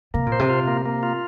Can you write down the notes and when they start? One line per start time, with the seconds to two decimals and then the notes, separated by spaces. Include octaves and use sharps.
0.14 C3 A#3
0.26 A#2
0.32 C5
0.39 C3
0.50 F4
0.67 A#3
0.85 A#3
1.03 F4